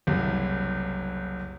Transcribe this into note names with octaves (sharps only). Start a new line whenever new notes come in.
F#1 C2